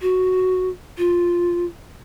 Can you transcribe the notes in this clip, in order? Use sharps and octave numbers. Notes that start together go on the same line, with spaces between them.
F#4
F4